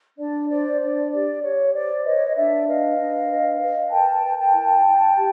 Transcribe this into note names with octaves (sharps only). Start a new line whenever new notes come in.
D4 D5
C5 D5
D4 D5
G4 D5
G4 C#5
C5 D5
B4 C#5 D#5
D#5
D4 D5 E5
B4 D#5 F5
D4
B4
B4
A#4 G5 A5
A#4
G5 A5
E4
E4
G4